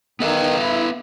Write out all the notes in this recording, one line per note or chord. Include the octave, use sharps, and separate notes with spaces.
E2 D#3 B3 A4 B4
E4